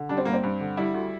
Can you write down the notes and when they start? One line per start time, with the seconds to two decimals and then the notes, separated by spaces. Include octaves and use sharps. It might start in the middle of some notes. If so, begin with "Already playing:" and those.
Already playing: D3
0.09 G3 D4
0.17 C4
0.25 G2 A#3
0.33 C4
0.43 G2
0.60 D3
0.77 G3 E4
0.94 D2